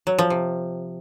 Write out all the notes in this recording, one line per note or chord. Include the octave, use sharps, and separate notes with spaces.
F#3
F3
C3